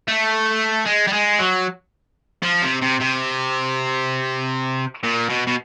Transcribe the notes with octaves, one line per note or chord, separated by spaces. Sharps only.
A3
G#3
G3
G#3
F#3
F3
C3
C3
C3
A#2
B2
B2